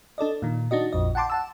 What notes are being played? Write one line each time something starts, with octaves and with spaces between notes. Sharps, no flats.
D4 A4 D5 D#5
A#2 D#3
D4 D#4 F#4 D#5
A#1 F2 D#5
F#5 G5 A5 C6 D6
F#5 A5 E6